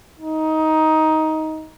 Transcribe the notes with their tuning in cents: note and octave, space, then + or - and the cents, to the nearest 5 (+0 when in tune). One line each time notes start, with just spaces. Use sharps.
D#4 +15